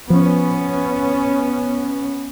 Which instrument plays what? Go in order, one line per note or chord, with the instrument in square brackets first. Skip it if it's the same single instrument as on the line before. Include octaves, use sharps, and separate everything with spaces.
[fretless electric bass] F3 [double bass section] B3 C#4